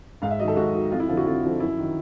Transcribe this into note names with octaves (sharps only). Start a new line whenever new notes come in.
G#2 F5
E5
D#3 F#3 A4 D#5
G#2 F#4
D#3 F#3
F2 F4
E4
D3 F3 F4
F#4
F2 F4
D3 F3
F#2 E4
D#3 F#3